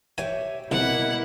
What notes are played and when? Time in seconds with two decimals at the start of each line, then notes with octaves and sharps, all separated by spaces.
0.18 G4 C#5 E5 G#5
0.72 C2 B2 A#3 E4 F#5